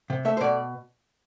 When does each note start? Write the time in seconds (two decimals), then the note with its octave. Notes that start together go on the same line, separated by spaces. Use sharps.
0.10 C3
0.25 A3 E5
0.37 C5
0.41 B2 D5